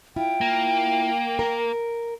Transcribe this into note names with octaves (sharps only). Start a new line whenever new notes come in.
E4 F4 G5
A#3
A#4